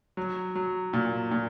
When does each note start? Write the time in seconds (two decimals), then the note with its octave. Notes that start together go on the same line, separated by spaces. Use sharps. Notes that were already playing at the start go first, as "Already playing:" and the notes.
0.17 F#3
0.55 F#3
0.93 A#2
1.31 A#2